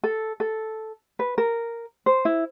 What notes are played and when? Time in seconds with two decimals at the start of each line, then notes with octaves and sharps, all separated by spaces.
0.04 A4
0.40 A4
1.19 B4
1.38 A#4
2.06 C5
2.25 E4